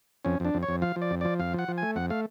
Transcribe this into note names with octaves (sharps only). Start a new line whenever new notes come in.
F2 C#4
F2 D4
F2
C#5
F2
F3 F5
F3
D5
F2
F3 D5
F2 F5
F3 F#5
F3
A3 G#5
F2 F#5
A3 F5